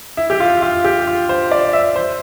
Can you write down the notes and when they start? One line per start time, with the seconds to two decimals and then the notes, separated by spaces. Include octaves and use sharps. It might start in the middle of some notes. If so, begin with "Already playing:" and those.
0.17 E4
0.30 G4
0.40 F4
0.62 F4
0.85 G4
1.07 F4
1.29 C5
1.52 D5
1.73 E5
1.96 C5